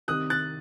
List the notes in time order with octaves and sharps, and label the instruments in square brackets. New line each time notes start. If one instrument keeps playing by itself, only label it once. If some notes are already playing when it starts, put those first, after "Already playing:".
[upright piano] C2 C3 D#3 [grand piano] D#6 F#6
[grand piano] F#6 A6